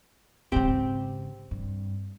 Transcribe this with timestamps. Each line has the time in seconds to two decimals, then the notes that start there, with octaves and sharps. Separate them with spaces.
0.52 G#1 C#3 C4 G4 G5
1.51 G2